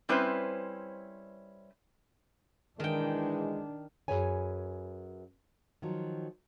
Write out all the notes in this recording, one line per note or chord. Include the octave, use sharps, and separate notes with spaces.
G3 C4 C#4 E4 B4 C5
D#3 E3 G#3 D4 G5
F#2 C#3 G#4 B4 C#5 G#5
D#3 F3 F#3